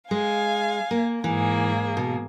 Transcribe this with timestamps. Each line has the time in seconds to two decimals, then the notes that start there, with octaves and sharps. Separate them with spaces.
0.11 G#3 F5 G#5
0.91 A#3
1.24 G#2 E3 A#3 G#4
1.97 B2